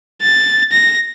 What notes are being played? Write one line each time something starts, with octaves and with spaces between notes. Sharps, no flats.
A6
A#6